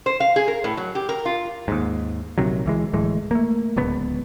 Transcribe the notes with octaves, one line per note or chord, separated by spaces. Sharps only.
C5
F5
G#4
A#4
A2
F#3
G4
A#4
F4
D#2 G#2
A#1 C3 D#3 F#3
C#2 E3 G#3
D1 A2 E3 G#3
A3 A#3
D1 C#2 B3